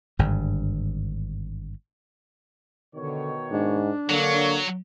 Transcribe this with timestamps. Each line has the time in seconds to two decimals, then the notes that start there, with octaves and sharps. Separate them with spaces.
0.19 G#1 G2 D3
2.95 B2 D3 D#3 C#5
3.51 G#2 D4
4.09 D3 F#3 A#3 C#5